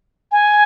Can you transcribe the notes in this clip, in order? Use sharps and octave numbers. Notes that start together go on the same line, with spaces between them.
G#5